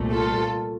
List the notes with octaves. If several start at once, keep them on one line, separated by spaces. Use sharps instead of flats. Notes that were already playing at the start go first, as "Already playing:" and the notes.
Already playing: C2 A#2 A3
F4 A4